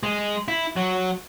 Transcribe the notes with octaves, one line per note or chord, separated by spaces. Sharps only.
G#3
E4
F#3